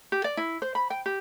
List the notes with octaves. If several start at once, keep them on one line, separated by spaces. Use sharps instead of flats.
G4
D5
E4
C5
B5
G5
G4